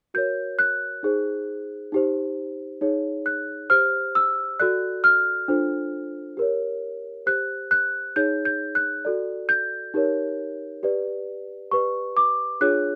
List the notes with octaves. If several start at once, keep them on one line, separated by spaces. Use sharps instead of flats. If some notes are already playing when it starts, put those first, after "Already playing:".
F#4 A#4 C#5 G6
F#6
D#4 G#4 C5
D#4 G4 C5
D#4 G#4 C#5
F#6
G4 C5 F6
E6
F#4 A4 D5 F#6
F6
D4 F4 A4 C5
G4 A#4 C#5
G4 C5 F#6
F#6
D#4 G#4 C#5 G6
G6
F#6
F#4 A4 D5
G6
D#4 G4 A#4 C#5
G4 B4 D5
G4 B4 D5 C#6
D6
D4 F4 G#4 C#5 F#6